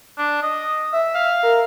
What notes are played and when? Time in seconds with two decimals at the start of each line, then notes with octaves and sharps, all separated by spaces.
0.18 D4
0.43 D#5
0.92 E5
1.15 F5
1.43 A#4